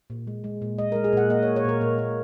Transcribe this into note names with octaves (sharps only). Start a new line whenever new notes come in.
A#2
G#3
G#3
A#2
G#3 D#5
A#4
G#3
G#4
A#2 F#5
A#3 D#5
C#5
A#3
C#5
A#2 A#4
A#2 A#3
A#3